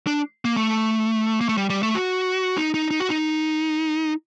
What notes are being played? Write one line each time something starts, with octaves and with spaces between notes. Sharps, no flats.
D4
A#3
A3
A#3
A3
G3
G3
A3
F#4
D#4
D#4
D#4
F#4
D#4